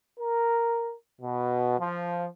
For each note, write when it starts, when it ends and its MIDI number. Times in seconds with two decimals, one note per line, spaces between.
0.19 0.94 70
1.21 1.78 47
1.79 2.27 53